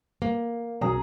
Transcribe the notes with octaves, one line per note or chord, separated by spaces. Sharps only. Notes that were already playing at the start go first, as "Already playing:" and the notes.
A#3
B1 F#2 G#4 A#5